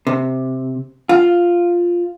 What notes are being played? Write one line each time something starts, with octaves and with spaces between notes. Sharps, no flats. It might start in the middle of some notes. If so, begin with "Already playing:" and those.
C3
F4